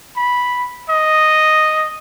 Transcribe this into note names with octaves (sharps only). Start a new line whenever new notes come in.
B5
D#5